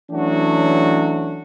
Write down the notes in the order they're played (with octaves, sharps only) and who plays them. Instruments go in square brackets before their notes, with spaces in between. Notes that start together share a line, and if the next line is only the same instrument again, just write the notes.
[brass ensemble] E3 F#3 A3 C#4 D4 F#4